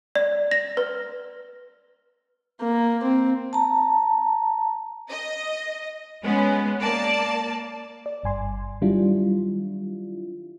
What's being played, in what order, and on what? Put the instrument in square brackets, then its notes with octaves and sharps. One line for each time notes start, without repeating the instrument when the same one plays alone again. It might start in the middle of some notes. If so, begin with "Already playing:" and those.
[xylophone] D5
A#6
B4
[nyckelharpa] A#3
C4
[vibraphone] A5 A#5
[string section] D#5
G#3 B3 C#4
A#3 D5 A5
[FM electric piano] D5
G1 G2 G#5 C6
D#3 F#3 G3 D4 E4 F4